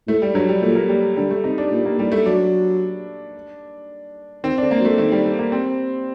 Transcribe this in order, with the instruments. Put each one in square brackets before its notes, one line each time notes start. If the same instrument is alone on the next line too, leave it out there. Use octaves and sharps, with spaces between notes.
[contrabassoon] A2 [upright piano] A3
[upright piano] G3
[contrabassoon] G2 [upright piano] F#3
[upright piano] G3
[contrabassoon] A#2 [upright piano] A3
[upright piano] A#3
G3
[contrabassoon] D3 [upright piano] G3
[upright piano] A3
[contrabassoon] C3 [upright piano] D#4
[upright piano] D4
[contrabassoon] A#2
[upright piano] A#3
[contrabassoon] A2 [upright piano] G3
[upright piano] A3
[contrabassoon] F#3 [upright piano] D4
[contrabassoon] D#3 [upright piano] C4
[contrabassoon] D3 [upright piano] D4
[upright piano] A#3
[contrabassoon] F#3
[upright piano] A3
[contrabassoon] D#3 [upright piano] A3
[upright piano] G3
A3
A#3
C4